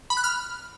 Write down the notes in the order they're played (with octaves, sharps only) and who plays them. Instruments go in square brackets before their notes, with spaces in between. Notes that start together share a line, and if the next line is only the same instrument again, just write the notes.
[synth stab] B5
F#6
F6